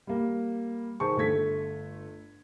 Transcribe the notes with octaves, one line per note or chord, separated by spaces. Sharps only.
G3 A#3
D#3 G#4 C5 A5 C#6
G1 A3 A4 G#6 B6